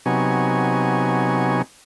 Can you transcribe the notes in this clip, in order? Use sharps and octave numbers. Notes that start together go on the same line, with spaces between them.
C3 F#3 B3 D#4 G#5 C#6